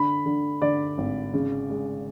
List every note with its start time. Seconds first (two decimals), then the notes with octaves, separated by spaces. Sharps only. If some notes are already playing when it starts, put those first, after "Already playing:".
Already playing: D3 B5
0.26 D3
0.62 D3 D5
0.98 G#1
1.33 C#3
1.70 G#3